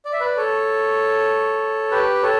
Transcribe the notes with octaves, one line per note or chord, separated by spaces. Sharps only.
D5
E5
B4 D5
A4 C#5
G4 B4
A4 C#5